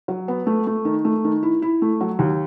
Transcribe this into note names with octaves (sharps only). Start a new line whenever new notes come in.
F#3
B3
A3
A3
D#3
A3
D#3
E4
E4
A3
F#3
D#2